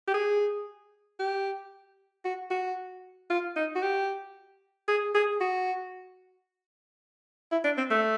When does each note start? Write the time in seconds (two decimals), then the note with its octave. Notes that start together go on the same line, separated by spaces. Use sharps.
0.08 G4
0.14 G#4
1.19 G4
2.25 F#4
2.51 F#4
3.30 F4
3.56 D#4
3.75 F#4
3.82 G4
4.88 G#4
5.15 G#4
5.41 F#4
7.52 E4
7.64 D4
7.78 C4
7.90 A3